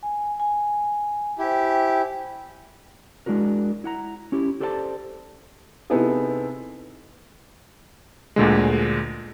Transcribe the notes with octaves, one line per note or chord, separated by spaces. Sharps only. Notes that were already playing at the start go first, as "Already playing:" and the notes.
G#5
G#5
E4 G4 C5 G5 G#5
G#3 D4 E4 F#4 A#4
E4 F#5 A#5
C#4 E4 G4
G4 A4 C5 D5 F#5 A5
C3 B3 D#4 E4 G#4 A4
D2 A#2 D3 G#3